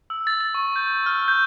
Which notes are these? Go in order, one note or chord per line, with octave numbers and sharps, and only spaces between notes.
E6
A6
A6
C#6
G6
F6
G6